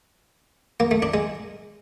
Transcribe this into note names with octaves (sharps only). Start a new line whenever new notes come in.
A#3
A3
D4
G#3